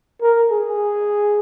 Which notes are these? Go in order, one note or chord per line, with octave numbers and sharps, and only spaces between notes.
A#4
G#4